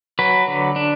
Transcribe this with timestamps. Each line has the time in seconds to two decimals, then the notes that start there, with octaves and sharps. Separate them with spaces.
0.19 F#3 B4
0.48 D3
0.76 D4